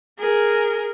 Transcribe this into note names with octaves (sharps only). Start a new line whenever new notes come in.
G#4 A#4